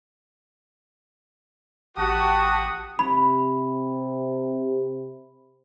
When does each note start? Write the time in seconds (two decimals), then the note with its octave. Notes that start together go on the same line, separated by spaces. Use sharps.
1.98 A1 F#4 G4 A5 D#6
2.99 C3 B5